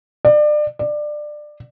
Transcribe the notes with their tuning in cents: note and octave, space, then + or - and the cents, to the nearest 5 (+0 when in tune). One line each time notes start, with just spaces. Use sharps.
D5 +30
D5 +20